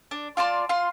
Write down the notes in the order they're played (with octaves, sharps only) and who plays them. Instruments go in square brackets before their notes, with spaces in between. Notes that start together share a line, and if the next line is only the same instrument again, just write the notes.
[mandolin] D4
F4 D5 A5 C6
F4 C6